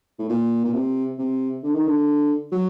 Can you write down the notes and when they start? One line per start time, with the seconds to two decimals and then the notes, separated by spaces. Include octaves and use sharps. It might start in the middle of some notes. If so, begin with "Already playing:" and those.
0.19 A2
0.29 A#2
0.65 A#2
0.74 C3
1.19 C3
1.63 D3
1.75 D#3
1.87 D3
2.52 F#3